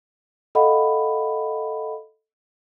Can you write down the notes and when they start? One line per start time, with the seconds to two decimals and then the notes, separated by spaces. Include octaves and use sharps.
0.55 A4 D#5 F5 F#5 B5